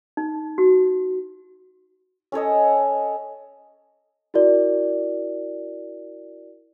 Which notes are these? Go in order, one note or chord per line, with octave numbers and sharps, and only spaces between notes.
D#4
F#4
C#4 A4 C#5 D#5
E4 F#4 A#4 D5